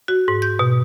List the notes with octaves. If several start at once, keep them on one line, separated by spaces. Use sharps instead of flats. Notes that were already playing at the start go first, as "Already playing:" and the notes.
F#4
G#2
G6
B2